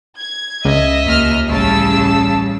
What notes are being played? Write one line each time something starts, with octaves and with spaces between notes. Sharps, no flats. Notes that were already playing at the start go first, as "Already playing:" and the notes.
G#6
C#2 D#5 E5
D#2 F6
A1 C#3 G3 A5 E6